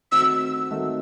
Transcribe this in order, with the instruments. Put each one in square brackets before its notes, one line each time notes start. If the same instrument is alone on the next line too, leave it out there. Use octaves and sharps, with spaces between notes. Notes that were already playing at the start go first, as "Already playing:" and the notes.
[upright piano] D#3 A3 C4 D#4 F#4 [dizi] E6
[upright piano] D#3 A3 C4 D#4 F#4